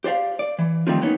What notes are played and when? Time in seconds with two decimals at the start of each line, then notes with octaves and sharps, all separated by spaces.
0.04 G4 C5 D5 F5
0.39 D5
0.59 E3
0.87 D#3 F3 G3 A3 C4 F4
1.01 F#3 A#3 B3 C#4 D#4